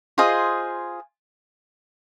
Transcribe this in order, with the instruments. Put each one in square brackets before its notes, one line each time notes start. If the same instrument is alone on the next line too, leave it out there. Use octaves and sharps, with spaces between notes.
[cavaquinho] F4 G#4 C5 D#5